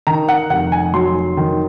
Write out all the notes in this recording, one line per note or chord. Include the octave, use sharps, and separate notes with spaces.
D#3 A#5
F#5
F1 F#5
G#5
F#3 C6
D#3